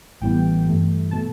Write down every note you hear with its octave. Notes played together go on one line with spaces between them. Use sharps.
A1 A2 E3 G3 B3 G5
G2 E3 A3
B2 A3 A5